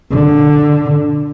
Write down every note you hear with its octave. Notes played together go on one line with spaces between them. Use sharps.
D3